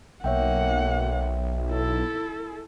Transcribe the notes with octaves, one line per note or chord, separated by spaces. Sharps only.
B1 A#3 C#5 E5 F#5 G5
E4 A4